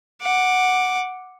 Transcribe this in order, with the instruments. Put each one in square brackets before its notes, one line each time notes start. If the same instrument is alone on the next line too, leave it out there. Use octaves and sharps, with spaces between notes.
[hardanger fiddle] F#5 D6